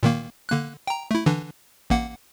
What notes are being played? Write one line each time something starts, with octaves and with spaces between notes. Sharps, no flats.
A#2 D#3 A#3
D3 A#3 F#6
G5 A#5
A3 E4
D3 E3 D4
A1 A#3 F#5